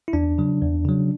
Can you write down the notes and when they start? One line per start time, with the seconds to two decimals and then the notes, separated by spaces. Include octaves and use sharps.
0.08 E4
0.13 E2 D4
0.38 C#3 F#3
0.62 E2
0.85 C#3 F#3